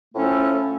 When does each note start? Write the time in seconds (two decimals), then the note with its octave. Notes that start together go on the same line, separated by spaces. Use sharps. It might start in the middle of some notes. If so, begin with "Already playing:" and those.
0.14 A2 F3 A3 C#4 A4